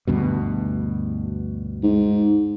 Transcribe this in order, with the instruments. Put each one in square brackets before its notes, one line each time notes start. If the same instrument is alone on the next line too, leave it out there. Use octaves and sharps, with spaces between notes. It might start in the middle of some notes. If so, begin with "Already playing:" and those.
[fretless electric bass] D2 G2 B2
[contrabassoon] G#2